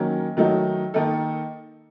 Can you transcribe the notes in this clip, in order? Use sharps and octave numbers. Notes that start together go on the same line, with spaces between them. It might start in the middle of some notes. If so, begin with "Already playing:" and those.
Already playing: D#3 F#3 A#3 C#4
D#3 F#3 A3 D#4 F#4
D#3 A#3 D#4 A4